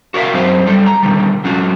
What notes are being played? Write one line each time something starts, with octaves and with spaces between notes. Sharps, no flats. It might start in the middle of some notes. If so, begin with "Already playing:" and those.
F#4 A#4 D5 E5 F5
F#2 F#3 C4 D#4 C5
G3 F4 G4 A4
A#5
B2 D3 D#3 G3
F#3 C#4 F4 F#4